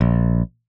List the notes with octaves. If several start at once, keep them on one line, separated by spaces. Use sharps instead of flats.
A#1